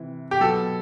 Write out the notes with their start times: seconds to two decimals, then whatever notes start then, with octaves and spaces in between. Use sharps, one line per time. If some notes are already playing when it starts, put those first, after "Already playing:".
Already playing: C3 E3
0.31 G4
0.41 B2 F#3 A4